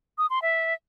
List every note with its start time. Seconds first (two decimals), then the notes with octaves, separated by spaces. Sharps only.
0.18 D#6
0.30 C6
0.42 E5